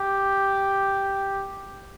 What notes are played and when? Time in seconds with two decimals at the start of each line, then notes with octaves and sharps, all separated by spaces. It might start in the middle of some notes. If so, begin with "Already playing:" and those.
Already playing: G4